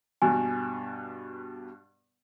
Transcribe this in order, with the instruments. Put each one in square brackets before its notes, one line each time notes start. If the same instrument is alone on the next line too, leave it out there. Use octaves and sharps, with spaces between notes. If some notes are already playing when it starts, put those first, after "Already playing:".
[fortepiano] G2 B2 [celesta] G#5